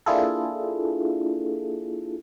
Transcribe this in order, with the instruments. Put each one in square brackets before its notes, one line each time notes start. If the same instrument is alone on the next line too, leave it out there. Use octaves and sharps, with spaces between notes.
[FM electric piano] A#3 D4 E4 F4 G#4 A4